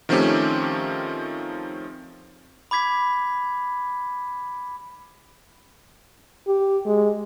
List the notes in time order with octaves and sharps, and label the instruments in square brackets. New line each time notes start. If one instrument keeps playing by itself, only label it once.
[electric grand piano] D#3 F3 A3 C4 C#4 G4
[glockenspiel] B5 D6 G#6 B6
[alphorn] G4
G#3